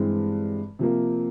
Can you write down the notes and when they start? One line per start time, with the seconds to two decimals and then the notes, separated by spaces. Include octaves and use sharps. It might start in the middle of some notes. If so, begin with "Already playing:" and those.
Already playing: G2 E3 G#3 C4
0.79 C3 F3 A#3